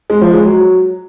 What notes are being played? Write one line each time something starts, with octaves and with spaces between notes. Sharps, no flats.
G#3
F3
G#3
F#3